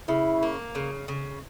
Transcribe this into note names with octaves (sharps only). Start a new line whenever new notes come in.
C#3 E4
A#3
C#3
C#3